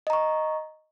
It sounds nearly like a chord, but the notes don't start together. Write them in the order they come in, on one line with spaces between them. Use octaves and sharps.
D#5 A#5 C#6